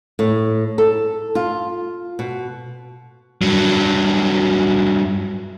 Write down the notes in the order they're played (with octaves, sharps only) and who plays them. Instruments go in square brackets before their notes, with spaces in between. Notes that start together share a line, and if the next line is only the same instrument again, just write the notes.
[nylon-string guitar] A2
A4
F4
B2
[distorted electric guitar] G2 F#3